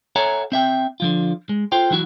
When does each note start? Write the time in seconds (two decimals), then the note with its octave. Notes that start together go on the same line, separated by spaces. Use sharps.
0.16 A4 C#5 E5 F#5 G#5 A#5
0.52 C4 E5 G5
1.00 D3 F3 F4
1.49 G#3
1.72 F4 A4 C5 G5
1.91 E3 F#3 E4 F#4